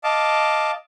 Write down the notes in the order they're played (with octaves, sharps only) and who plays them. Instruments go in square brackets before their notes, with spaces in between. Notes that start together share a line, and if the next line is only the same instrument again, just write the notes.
[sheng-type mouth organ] D#5 F5 A5 D6